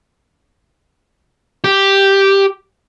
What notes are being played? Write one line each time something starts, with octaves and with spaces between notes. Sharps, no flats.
G4